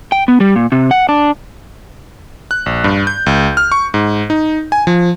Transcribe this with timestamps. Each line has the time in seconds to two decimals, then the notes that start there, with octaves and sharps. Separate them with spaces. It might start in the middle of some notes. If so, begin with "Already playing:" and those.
0.12 G5
0.28 B3
0.40 G3
0.56 A#2
0.72 C3
0.91 F#5
1.09 D4
2.51 F#6
2.66 A#1
2.84 G2
3.07 G6
3.26 C#2
3.57 F6
3.72 C#6
3.94 G#2
4.30 D#4
4.72 G#5
4.87 F3